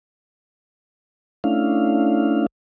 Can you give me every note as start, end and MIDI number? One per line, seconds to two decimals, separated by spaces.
1.44 2.47 57
1.44 2.47 61
1.44 2.47 62
1.44 2.47 64
1.44 2.47 77